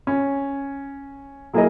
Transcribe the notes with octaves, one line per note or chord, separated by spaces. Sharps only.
C#4
F#3 A#3 E4 G#4 A#4 D#5